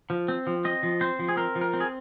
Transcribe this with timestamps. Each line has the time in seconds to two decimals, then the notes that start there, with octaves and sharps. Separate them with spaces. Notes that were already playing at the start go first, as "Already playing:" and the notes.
0.10 F3
0.28 C4
0.47 F3
0.65 C4 D#5
0.83 F3
1.01 C4 C5
1.19 F3
1.29 G#4
1.37 C4 A#4
1.55 F3
1.61 A#4
1.73 C4
1.80 G#4